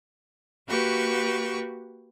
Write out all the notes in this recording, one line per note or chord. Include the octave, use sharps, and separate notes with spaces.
A#3 F#4 G4 B4 C#6